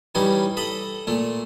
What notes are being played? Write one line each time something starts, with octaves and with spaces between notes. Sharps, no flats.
E3 G3 C#4 D#4
A4 D#5 B5
A#2 A3